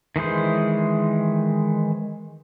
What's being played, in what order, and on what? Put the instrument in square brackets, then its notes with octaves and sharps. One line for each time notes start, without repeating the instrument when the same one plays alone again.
[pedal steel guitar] D#3 E3 G#3 C5